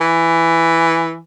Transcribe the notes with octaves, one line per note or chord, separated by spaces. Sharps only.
E3